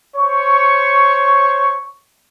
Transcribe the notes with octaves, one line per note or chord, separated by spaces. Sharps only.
C5 C#5 C#6